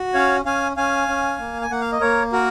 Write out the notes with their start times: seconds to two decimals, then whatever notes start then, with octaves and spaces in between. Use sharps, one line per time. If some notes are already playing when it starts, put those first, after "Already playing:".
Already playing: F#4
0.14 C#4 C#5 F5
0.45 C#4 F5 G#5
0.77 C#4 F5 G#5
1.08 C#4
1.39 A#3
1.62 G#5
1.70 A#3 F#5
1.81 F5
1.92 D#5
2.01 A#3 A#4 C#5
2.32 F#4 A#4